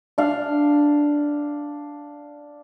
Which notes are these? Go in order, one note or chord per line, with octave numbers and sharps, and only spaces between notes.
D4 F5